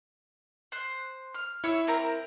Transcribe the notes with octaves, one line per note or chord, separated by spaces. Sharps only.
C5 F#6
F6
E4 C#5 E6
C4 A#4 A#5